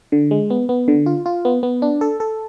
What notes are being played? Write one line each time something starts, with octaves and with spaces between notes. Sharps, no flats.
D3
G#3
B3
B3
D3
F4
F4
B3
B3
D4
A4
A4